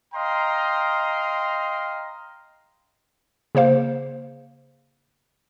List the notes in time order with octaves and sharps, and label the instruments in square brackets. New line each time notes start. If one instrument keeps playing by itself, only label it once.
[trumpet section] D#5 F5 G5 A#5 C6
[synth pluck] C#3 A#3 C5 F5